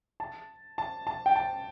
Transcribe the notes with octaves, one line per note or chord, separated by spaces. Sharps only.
A5
A5
A5
G5
A5